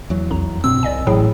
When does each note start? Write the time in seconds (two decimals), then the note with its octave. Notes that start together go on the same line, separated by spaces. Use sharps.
0.10 E2 F#3
0.30 B1 F2 A#5
0.64 G2 B2 C4 E6
0.83 C2 D5 D#5 G#5
1.07 A1 A2 F#3 G#4 G5